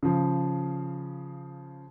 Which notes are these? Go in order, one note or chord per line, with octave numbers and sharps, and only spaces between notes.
C#3 F3